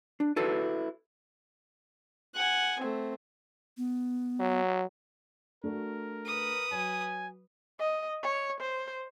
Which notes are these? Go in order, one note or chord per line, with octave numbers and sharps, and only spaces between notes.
D4
E4 F#4 A4 B4
F#5 G#5
A3 C4
B3
F#3
A3 D4 F#4 A#4
B4 D#6
F#3 G#5
D#5
C#5
C5